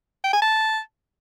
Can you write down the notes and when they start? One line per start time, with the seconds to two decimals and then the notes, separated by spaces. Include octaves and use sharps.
0.24 G5
0.33 G#5
0.42 A5